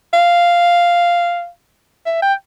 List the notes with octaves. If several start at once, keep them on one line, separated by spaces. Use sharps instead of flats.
F5
E5
G5